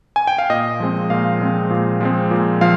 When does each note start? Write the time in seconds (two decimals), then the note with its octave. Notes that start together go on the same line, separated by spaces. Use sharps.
0.16 G#5
0.27 G5
0.38 F5
0.50 A#2 D#5
0.80 F3 G#3 C4
1.10 A#2 F5
1.41 F3 G#3 C4
1.70 A#2
2.01 F3 G#3 C4
2.31 A#2
2.61 F3 F5